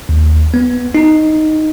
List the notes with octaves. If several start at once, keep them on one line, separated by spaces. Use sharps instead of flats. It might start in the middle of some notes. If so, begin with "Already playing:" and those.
D#2
B3
D#4